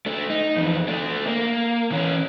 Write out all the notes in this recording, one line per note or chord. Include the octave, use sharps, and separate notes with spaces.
A3 D4
D#4
F2 E3
A3 D4
A#3
E3 C#4